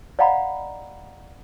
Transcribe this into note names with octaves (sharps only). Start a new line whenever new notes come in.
D5 D#5 F5 F#5 A#5 B5